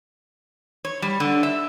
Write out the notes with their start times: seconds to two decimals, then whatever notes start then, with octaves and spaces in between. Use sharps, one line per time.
0.85 C#5
1.02 G3
1.20 D3
1.43 E5